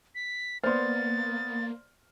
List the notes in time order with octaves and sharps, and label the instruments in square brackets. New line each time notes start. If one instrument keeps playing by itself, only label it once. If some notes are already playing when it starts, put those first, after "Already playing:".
[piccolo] B6
[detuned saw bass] A#3 [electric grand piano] B3 F6 [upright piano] C5 D5 C6 [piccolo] A6